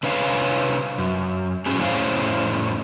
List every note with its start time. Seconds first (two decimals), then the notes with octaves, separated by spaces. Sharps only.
0.03 C3 D4 B4 C#5 F5 G#5
0.98 F#2
1.66 G#2 F#3 C#4 G#4
1.78 F2 A2 C#4 F4 C5 F5